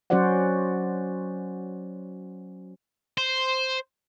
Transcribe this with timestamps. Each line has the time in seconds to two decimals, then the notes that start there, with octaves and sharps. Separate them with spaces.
0.10 F#3 C#4 F#4 C5 D5 F#5
3.18 C5